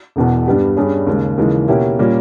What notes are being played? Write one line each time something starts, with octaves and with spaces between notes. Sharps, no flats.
E1 E2 B2
G2 G3 B3 G4
G2 G3 C#4 G#4
D#2 C#3 G#3
D#2 C#3 E3 G#3
B2 A#3 C#4 E4 G4
A#2 G3 A#3 C#4